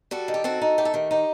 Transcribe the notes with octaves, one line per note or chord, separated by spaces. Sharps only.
G3 F#4 A4
D#3
G4
C4 F#4 A4
D#4
A3 G4
A4
D#3 G4
D#4 G4